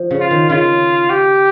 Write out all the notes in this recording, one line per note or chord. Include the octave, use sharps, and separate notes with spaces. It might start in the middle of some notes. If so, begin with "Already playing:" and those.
Already playing: F3
C#3
F4
D#3
C#3 F4
G4